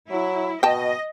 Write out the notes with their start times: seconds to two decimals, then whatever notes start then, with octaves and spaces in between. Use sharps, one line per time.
0.11 F#3 E4
0.63 B2 D#5 G5 A5